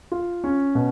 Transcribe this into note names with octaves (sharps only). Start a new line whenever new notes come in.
F4
C#4
B2